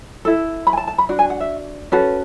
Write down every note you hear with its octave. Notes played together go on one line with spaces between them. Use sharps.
E4 A4
B5
G#5
A5
A5
B5
D4 F#4
G#5
F#5
E5
C#4 F#4 A4 B4